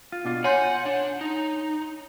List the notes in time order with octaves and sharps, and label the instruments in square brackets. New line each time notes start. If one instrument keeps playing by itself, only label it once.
[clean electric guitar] F4
B2 D4 F4
[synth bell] C#5 C6 G6 [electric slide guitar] F#5 [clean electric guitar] G#5
[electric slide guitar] D4
D#4